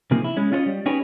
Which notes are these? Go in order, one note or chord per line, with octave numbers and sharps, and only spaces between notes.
C3 D#3 F3 A#3 G#4
E4
G#3 C#4
C#4 F4 G#4 C5 C#5 D#5
G3
C#4 D#4 G4 G#4 B4 C#5